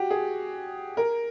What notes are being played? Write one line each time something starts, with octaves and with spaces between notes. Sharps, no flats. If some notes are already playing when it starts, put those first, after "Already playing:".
Already playing: F#4 G4
G#4
A#4